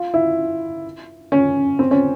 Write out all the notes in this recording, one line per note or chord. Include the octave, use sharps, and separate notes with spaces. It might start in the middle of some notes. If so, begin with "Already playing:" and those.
Already playing: F4
E4
C#4
C4
C#4